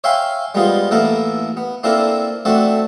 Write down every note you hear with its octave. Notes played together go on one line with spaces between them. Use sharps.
C#5 E5 F5 G5 G#5 C6
G3 G#3 B3 F4 G#4 C5
A1 A#3 B3 E4 A4 A#4
B3
A#3 C4 D4 E4 A4 A#4
A3 C4 D4 F#4 A4